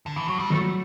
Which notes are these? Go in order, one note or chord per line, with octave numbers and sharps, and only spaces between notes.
D3
E3
F#3
G3
F#3 A3